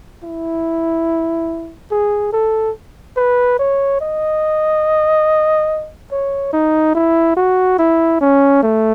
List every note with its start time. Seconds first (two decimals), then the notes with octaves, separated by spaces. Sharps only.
0.23 E4
1.91 G#4
2.33 A4
3.17 B4
3.59 C#5
4.01 D#5
6.11 C#5
6.53 D#4
6.95 E4
7.37 F#4
7.79 E4
8.21 C#4
8.63 A3